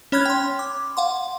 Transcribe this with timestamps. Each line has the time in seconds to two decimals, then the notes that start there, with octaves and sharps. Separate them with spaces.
0.12 C#4 C#5 B5 F6 F#6 G#6
0.26 G5 C6
0.59 D6
0.97 F5 F#5 C6